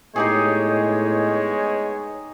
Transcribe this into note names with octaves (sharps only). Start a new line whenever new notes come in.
A2 G#3 B3 D#4 G4 G#4 C#5